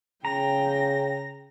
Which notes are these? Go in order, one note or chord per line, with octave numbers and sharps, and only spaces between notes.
C#3 G5 A#5 A#6